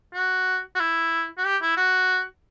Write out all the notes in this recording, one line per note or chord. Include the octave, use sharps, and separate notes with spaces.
F#4
F#4
E4
F#4
G4
E4
F#4